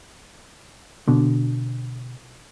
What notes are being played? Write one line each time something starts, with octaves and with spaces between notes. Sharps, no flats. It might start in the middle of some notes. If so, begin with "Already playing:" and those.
B2 D3